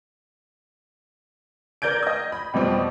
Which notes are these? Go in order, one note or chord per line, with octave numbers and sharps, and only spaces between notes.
A#4 D5 G6 G#6 D7
D#5 D#6
B5
F2 B2 G3 C4